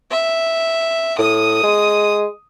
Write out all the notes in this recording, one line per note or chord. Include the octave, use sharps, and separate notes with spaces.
E5
A2 D#6 D#7
G#3